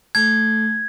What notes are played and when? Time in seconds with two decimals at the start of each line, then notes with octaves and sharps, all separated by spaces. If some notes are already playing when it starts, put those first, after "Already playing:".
0.15 A3 A4 G#6